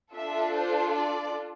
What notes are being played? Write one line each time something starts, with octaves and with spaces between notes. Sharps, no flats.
D4 F4 A4 E5
C5
D5